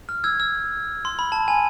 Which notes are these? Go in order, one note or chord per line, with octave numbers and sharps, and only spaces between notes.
F6
E6 G#6
E6
C6
B5
A5
G#5